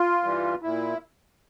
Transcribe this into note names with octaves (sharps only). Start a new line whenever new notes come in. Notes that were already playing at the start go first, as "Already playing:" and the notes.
Already playing: F4
G2 E3 G3
A#2 E4